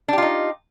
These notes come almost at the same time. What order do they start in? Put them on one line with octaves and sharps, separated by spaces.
D4 G4 F4 D#4